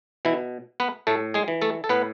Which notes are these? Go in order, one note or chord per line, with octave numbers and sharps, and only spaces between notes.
B2 E3 E4
B3 B4
A2 A3 A4
G#3 G#4
E3
A3 A4
A4
A2 B3 B4